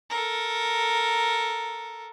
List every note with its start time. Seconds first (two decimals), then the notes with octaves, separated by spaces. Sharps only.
0.10 A4 A#4